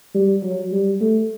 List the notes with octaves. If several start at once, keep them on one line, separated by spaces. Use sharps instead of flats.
G3
F#3
G3
A3